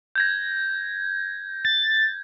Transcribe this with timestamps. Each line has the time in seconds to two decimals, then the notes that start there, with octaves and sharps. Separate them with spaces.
0.15 G6 G#6 A#6
1.65 A6